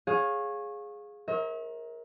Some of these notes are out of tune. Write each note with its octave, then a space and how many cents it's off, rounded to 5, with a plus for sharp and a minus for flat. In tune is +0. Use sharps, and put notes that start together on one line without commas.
G#4 +0 C#5 -20 F5 +20
A#4 +15 C#5 -40 E5 -45